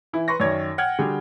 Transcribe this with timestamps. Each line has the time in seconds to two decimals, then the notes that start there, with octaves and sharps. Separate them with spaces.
0.13 E3 E4
0.28 B4 C6 C#6 A#6
0.40 F#2 D#3 C#5 D5 G#6
0.78 F#5 G5 F6 G#6
0.99 D3 G3 F#4 G#4 G5